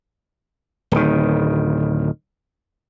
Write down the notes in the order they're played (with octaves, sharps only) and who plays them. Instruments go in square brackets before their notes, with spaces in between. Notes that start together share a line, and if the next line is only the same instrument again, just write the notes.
[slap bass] D1 D#3